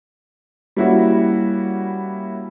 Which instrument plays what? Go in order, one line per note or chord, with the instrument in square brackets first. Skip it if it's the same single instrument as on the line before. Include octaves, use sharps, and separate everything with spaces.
[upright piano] G3 A#3 C#4 E4 F#4